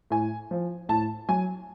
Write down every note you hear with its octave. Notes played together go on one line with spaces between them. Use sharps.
A2 G#5
F3
A2 A5
F#3 G#5